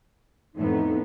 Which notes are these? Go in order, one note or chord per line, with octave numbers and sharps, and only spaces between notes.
F2 A2 B3 D#4